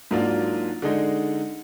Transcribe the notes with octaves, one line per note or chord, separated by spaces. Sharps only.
G#2 F#3 A#3 D4 F4
D3 G#3 D#4